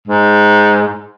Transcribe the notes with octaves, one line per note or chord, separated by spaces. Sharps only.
G#2